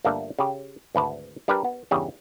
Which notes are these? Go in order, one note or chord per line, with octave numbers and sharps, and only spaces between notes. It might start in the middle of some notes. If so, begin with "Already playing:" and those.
G1 A3 A#3 D4 A4
C#3 G4
G#1 D2 B4 A5
G3 D4 G4 A#4 B4
B3
E2 G2 C#3 G3